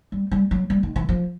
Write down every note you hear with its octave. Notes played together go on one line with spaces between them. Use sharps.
G3
G3
F#3
G3
D#3
E3
F3